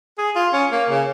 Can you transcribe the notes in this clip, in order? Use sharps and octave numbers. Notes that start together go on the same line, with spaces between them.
G#4
F4
C#4
A#3
C#3